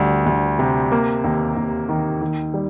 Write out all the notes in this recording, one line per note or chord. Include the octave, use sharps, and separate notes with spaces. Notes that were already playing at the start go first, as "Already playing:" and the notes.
Already playing: D2 G3
D2
C3
A#3
D#2
D#2
D#3
D#3
G3